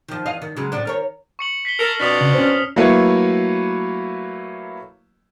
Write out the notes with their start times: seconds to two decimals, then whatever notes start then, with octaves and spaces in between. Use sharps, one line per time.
0.08 D#3 F3
0.26 E2 D#5 F5
0.42 D#3
0.56 C#3 F#3 G#3
0.72 A2 D4
0.85 D#3 A#4 C#5
1.39 C#6 C#7 F#7
1.65 B6 C7 G7
1.79 A4 A#4 F6
1.99 F2 B2 D4 D#6 B6
2.21 C#3
2.34 C#4 C5
2.76 F#3 A3 A#3 E4 B4 C#5